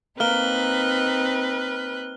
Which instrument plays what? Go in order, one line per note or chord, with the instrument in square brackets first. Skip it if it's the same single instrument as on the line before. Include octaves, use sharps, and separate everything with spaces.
[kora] A#3 [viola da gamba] C4 D#4 [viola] B4 [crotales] F6 G7